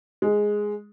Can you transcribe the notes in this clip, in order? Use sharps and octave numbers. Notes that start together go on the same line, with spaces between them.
G#3